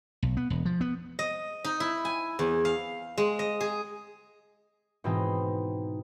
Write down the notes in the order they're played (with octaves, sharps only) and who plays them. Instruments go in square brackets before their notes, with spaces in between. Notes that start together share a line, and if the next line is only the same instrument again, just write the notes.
[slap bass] B1
B3
E1
F3
B3
[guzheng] D#5
D#4
E4
G#5
E2
F5
G#3
D#5
G#4
[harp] G#2 B2 E3 C4 D#4